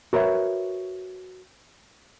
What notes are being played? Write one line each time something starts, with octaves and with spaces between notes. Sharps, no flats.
F#4 A#4 B4 C#5 E5